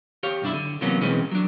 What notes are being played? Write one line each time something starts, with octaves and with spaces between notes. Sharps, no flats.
G4 C#5 F5
B1 F#2 D4 E4
D3
C3 E3 F#3 A#3 B3 C#4
B2 E3 G#3 C4 C#4 B4
F#3 D4